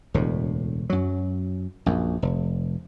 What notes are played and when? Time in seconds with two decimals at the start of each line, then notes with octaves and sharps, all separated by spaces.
0.14 E1 D2 A2
0.90 F#2 F#3
1.86 A#1 F#2
2.22 F1